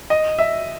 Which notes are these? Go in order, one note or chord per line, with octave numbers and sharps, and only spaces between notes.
D#5
E5